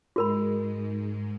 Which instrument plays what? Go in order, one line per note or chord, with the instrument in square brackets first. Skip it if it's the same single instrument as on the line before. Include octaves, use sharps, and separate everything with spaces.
[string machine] G#2 G#3 [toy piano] F#4 A#4 B5